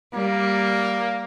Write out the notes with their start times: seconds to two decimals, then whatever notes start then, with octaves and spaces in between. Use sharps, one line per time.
0.14 G3 A#3